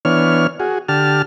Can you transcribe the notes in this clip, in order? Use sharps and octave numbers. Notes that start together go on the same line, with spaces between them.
E3 B3 D4 C#5 F6
F#4 G#4
D3 G4 A5 F6